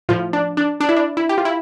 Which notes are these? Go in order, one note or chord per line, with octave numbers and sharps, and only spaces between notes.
A2 F3 F4
D4
D4
D4
E4
D4
E4
G4
F4
E4